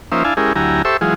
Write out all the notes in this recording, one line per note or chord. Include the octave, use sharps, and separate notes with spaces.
F3 A#3 C#4 D#4 C5 E5
D4 E4 F5 G#5 A5
G#3 C#4 E4 G4 G#4 A#4
D2 F#3 E4 G4 G#5 A#5
G4 A4 C5 E5 C#6 E6
E3 F#3 G#3 F4 G#4